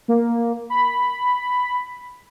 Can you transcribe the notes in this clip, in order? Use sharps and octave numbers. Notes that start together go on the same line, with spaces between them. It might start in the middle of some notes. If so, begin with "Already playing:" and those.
A#3
B5